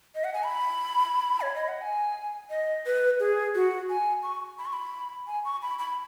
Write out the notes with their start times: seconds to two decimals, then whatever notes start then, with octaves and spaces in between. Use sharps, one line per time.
0.15 D#5
0.24 F#5
0.34 G#5
0.44 B5
1.41 C#5
1.55 D#5
1.68 F#5
1.81 G#5
2.50 D#5
2.86 B4
3.20 G#4
3.55 F#4
3.89 G#5
4.23 C#6
4.59 B5
4.66 C#6
4.73 B5
5.27 G#5
5.45 C#6
5.62 B5
5.79 B5